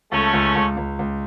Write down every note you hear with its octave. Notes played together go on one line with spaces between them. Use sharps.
C#2 A3 C#4
C#2
C#2
C#2
C#2